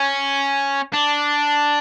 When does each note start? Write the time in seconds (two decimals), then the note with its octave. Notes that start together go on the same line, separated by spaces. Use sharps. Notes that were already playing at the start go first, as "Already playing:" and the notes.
Already playing: C#4
0.94 D4